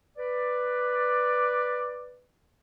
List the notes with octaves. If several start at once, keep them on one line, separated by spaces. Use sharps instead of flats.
B4 D5